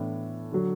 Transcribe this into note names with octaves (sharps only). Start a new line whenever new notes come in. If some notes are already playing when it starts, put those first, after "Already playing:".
Already playing: A2 E3 B3 D4 A4
D3 F#3